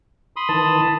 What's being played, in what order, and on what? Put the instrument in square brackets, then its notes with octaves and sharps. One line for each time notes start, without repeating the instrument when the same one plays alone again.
[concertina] B5 C6 D#6
[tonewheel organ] D#3 E3 [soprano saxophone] A5